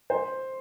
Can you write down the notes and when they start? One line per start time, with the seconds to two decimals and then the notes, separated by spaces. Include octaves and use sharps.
0.10 C5